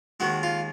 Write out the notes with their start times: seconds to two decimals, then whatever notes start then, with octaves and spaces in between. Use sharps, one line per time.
0.20 D#2 D#3 G#3 F#4
0.43 F4